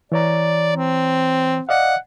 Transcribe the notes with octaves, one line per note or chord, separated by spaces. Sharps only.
E3 C#5 D5 A#5
C4
D5 D#5 F5 F#5